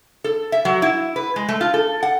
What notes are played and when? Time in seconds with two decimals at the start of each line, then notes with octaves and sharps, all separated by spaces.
0.24 A4
0.52 E5
0.65 F#3
0.82 E4
1.16 B4
1.36 G#3
1.49 A3
1.61 F4
1.74 A4
2.03 F#5